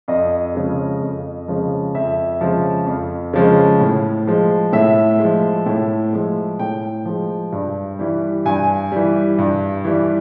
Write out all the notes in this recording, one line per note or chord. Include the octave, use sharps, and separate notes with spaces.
F2 D#5
C#3 F3 G#3
F2
C#3 F3 G#3
F2 E5
C#3 F3 G#3
F2
C#3 F3 G#3
A2
F3 G#3
A2 E5
F3 G#3
A2
F3 G#3
A2 G5
F3 G#3
G2
E3 G3
G2 G#5
E3 G3
G2
E3 G3